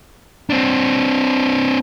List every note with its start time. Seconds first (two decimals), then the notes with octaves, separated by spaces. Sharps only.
0.50 C4 D4